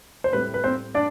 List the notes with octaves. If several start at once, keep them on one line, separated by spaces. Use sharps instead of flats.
C5
A2 G3 C4 B4
B4
C4 C5
D4 D5